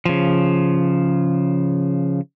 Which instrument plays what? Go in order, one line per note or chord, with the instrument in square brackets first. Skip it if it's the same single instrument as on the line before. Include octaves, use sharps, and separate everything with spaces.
[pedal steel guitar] C#3 F3